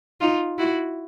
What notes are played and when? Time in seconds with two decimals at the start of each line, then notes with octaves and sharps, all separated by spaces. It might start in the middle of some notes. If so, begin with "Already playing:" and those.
0.21 D#4 F4
0.58 E4 F#4